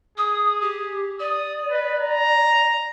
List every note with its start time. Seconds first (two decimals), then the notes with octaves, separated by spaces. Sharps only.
0.18 G#4 D#6
0.61 G4
1.20 D5 D#6
1.71 B4
2.01 A#5